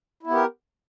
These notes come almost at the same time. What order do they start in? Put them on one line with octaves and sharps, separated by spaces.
E4 B3 G4 A#4